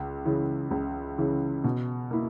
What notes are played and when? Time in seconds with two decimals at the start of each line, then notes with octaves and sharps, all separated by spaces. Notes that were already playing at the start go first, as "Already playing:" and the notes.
Already playing: C#2
0.25 C#3 E3
0.71 C#2
1.18 C#3 E3
1.64 B2
2.11 A#3 E4